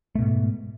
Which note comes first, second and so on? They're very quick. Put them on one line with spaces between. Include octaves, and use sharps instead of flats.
A3 B2 G#2